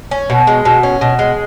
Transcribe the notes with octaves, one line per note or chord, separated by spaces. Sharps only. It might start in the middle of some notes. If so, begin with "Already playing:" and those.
C#4
B2
G#3
B2
C#4
B2
G#3